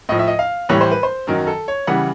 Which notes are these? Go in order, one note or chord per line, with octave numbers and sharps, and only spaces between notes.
A2 F3 D#5
E5
D#5
F5
A2 E3 G3 C#5
C5
B4
C5
F#2 D#3 F#3 A#4
A4
C#5
C#3 E3 G3 F#5